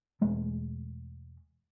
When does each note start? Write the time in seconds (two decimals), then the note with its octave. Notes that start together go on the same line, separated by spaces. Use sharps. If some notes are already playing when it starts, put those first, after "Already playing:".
0.21 E1 G#3 A3